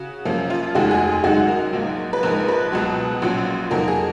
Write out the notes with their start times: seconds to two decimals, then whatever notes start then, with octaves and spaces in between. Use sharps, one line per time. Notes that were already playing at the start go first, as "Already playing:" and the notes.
Already playing: C#3 F#4
0.25 F#2 F3 A#3 C#4
0.50 F4
0.75 F1 D#2 D#3 G#3 F#4
0.91 G#4
1.08 G#4
1.24 F#2 D#3 G#3 D#4 F#4
1.48 A#4
1.73 A#1 G#2 F#3 A#3
2.13 B4
2.23 A#1 G#2 F3 A#4
2.48 B4
2.72 C#2 B2 F#3
3.22 A#1 A#2 F#3 C#4
3.71 F2 D#3 F#3 A#3 A#4
3.88 G#4